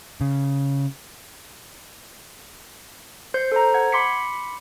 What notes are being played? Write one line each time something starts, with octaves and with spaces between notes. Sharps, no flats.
C#3
C5 G6 C7
A4 C5 A#5
F#5 G#6
B5 C6 D6 B6 C#7